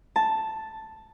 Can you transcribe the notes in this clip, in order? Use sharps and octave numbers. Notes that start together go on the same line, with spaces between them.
A5